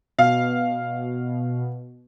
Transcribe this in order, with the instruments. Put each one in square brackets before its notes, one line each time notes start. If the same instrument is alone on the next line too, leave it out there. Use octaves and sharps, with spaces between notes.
[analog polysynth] B2 [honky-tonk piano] F5